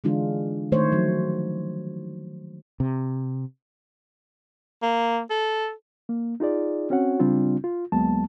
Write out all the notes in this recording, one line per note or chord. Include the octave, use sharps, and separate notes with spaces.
D3 E3 G#3 D4 F4
D#3 A3 C5 C#5
F3 F#3
C3
A#3
A4
A#3
D#4 F4 G#4 D5
C4 C#4 F#4 C#5 F#5
C#3 G3 C4 D4 F4
F4
D2 F#3 G#3 A#3 B3 A5